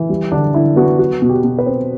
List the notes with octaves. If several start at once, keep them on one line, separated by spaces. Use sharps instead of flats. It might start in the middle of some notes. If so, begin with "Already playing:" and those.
Already playing: E3
G3
D3 D4
D3 E4
B3 F#4
F#3 F#4
B2
G4
B2
B4
C4